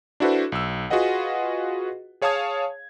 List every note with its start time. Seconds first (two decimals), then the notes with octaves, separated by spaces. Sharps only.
0.20 D4 E4 F#4 A4 B4 C5
0.52 B1 E6
0.90 F4 F#4 G#4 B4 D#5 F#5
2.22 G#4 C#5 F5 A5 D#6 G#6